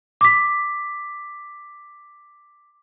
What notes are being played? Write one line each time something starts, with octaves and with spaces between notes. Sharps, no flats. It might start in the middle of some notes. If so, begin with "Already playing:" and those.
D6 B6